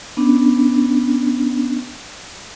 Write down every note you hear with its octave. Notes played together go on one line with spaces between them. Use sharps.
B3 C#4 D4